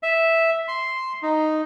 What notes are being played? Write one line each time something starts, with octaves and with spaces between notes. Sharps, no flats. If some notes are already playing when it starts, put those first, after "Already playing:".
E5
C6
D#4